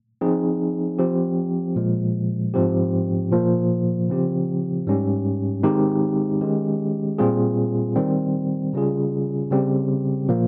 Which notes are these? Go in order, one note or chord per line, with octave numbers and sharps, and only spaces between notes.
F3 C4 D#4 G#4
F3 C4 G4
A#2 F3 G#3
G#2 F3 C4 G4
A#2 F3 A#3
C#3 F3 C4 G4
G#2 G3 C#4 G4
D#3 G#3 C4 D#4 G4
D#3 G#3 C#4 G4
A#2 G3 C4 F4 G#4
D#3 G3 C4
C#3 G3 C#4 F4 G#4
C#3 G3 C4 G4
A#2 F3 A#3